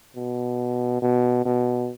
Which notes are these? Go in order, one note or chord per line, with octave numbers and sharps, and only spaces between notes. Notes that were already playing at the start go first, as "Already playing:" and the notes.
B2
B2
B2